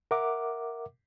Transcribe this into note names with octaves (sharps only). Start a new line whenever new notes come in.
A#4 E5 F#5 D6